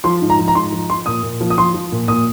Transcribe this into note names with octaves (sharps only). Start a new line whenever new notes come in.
F3 C6
G#2
A#5
F3
A#5
G#2 C6
F3
F3 C6
A#2 D#6
A#2
F3
D#6
F3 C6
F3
A#2
A#2 D#6